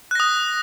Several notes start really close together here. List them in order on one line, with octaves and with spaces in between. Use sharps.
F#6 A#6 D#6